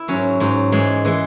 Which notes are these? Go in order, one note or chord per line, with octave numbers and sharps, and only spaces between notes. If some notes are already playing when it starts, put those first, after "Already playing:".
Already playing: E4
G#2 F#3 C#4
G#2 F#3
G#2 E3 G#3
E3 G#3